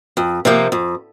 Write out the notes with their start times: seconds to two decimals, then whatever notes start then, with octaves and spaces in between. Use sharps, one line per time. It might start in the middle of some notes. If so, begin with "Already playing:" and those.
0.17 F2
0.45 C3 F3 A#3
0.72 F2